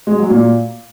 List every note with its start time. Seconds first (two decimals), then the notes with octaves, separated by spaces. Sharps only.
0.07 G#3
0.18 F#3
0.30 A#2